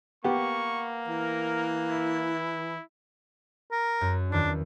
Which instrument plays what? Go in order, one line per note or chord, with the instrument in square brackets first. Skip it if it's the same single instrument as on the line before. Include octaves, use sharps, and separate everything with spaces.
[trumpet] A#3 [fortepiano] B3 G4 [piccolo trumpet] C#6
[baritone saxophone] E3 [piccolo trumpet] A#4
[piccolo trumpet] E4
[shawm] A#4
[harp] F#2
[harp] E2 D#3 [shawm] D4